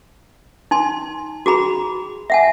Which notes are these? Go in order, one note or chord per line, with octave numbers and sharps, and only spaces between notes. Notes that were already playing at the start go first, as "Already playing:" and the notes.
D#4 G#5 C6
F#4 G#4 A#5 B5
E5 F#5 G#5